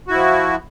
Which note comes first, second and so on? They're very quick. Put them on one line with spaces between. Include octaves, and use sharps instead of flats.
F#4 E4 F3